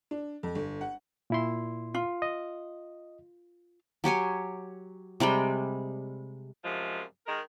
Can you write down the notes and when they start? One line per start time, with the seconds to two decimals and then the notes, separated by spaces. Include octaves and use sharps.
0.11 D4
0.43 F2
0.55 G1
0.81 F#5
1.30 A#2 E4 C6
1.94 F4
2.22 D#5
4.04 F#3 G4 C#5 G#5
5.20 C3 G3 G#3 G5
6.65 F#2 C3 F3 G#3
7.27 D#3 G#3 A#4